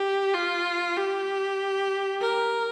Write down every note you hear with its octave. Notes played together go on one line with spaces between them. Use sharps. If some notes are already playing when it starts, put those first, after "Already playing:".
Already playing: G4
F4
G4
A#4